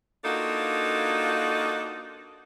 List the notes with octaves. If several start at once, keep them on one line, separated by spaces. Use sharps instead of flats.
A#3 D4 D#4 F4 F#4 A4